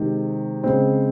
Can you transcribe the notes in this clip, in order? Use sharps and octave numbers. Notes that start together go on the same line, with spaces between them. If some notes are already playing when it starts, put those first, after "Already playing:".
Already playing: C3 D#3 G#3
C#3 G#3 C4